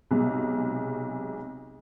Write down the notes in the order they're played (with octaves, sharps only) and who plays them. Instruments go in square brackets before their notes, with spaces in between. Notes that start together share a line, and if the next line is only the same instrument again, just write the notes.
[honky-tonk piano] B1 C3 G#3